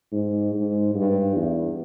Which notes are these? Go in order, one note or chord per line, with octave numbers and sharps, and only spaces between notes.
G#2
G#2
G2
E2